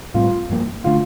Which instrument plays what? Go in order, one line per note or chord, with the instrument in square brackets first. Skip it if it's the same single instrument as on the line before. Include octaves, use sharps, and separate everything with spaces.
[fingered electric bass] A2 G3 C4 [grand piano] F4
[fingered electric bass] G2 F3 A#3
[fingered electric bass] D3 A3 D4 [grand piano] F4